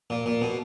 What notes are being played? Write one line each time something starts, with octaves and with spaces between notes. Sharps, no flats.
A#2
A#2
B2